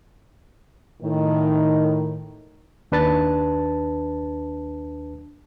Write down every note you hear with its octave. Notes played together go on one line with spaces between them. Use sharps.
A2 D#3
D#2 D4 B4 A5 A6